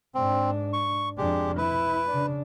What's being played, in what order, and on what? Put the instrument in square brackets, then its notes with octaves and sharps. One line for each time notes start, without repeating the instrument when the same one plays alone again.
[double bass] G#2 D4 [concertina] C4
[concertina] C#6
[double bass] F2 D4 [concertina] G#3 G4
[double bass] E4 [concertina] B4
[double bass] C#3 D4